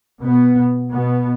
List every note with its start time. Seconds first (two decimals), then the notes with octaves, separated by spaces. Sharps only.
0.22 B2 B3
0.90 B2 B3